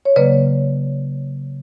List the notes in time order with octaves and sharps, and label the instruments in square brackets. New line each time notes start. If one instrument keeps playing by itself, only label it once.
[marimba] C#5
C#3 F#3 A#3 B4 D5